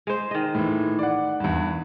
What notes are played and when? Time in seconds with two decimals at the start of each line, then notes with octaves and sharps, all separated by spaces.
0.07 G#3 C5
0.31 D#3 D#5
0.55 A2 E3
0.99 D5 F#5
1.40 E2 G2